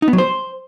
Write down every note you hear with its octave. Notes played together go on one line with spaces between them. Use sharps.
D#4
B3
F#3
C5